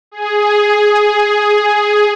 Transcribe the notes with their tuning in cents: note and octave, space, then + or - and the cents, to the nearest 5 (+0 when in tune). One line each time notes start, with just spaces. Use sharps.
G#4 +5